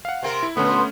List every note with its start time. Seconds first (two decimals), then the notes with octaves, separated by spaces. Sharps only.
0.05 F5 F#5
0.23 C3 C4 A#4
0.43 E4
0.57 A#2 D3 A3 B3 C#4